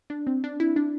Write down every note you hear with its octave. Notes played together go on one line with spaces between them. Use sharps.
D4
C4
D4
E4
D4